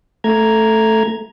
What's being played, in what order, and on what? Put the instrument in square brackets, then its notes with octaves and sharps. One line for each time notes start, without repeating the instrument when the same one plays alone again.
[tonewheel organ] A3 A#5 G#6